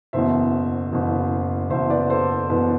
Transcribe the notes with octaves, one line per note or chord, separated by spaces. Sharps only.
F#1 E2 B2 C5 E5
F#1 E2 B2
F#1 E2 B2 C5 E5
B4 D5
A4 C5
B4
F#1 E2 B2 B4